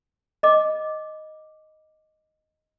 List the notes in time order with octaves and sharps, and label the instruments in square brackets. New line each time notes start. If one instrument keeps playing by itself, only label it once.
[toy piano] D#5 D6